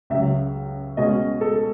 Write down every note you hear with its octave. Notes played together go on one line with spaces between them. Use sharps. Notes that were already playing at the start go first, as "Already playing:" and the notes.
C#2 C#3 F#3 E5
B2 G#3 C#4 D#5
A4